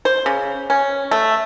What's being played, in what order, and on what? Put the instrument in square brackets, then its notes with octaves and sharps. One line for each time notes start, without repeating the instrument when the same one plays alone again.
[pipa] C5
C#3
C#4
A3